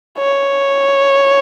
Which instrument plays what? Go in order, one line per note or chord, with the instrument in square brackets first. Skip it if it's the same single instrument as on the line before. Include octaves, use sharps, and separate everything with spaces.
[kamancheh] C#5